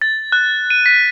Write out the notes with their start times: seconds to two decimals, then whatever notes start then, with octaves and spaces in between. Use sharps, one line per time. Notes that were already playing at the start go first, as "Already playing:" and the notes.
0.02 A6
0.32 F#6
0.70 D#7
0.86 B6